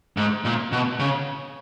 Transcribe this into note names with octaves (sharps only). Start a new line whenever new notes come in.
G#2
A#2
B2
C#3